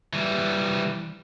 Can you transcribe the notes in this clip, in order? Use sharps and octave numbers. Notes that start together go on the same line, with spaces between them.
E3 G3